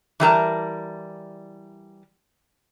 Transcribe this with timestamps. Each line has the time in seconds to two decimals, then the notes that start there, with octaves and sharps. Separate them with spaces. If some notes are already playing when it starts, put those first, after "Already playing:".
0.20 E3 G3 A#4 A5